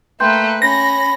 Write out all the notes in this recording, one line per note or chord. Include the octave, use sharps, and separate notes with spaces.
A3 A#3 B4 G5 C6 G6
C#4 B5 A#6